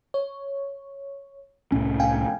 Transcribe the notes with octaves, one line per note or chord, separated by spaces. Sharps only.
C#5
C2 A2 C#4
F5 G5 G#5